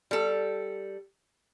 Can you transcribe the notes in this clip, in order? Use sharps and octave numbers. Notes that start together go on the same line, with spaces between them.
G3 A4